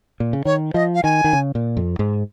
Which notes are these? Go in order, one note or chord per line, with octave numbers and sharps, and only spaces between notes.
A#2
C#3
D#3 C#5
F3 D#5
F5
D#3 G#5
D#3
C#3
A#2
F2
G#2